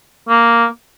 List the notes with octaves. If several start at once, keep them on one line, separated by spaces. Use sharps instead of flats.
A#3